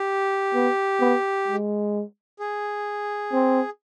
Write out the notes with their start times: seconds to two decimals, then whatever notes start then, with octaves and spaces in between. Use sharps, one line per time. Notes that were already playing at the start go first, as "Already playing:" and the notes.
Already playing: G4
0.54 B3
1.00 B3
1.47 G#3
2.40 G#4
3.33 C4